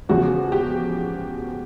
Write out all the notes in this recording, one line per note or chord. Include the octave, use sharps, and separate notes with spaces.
E2 C#3 F3 F#4
G4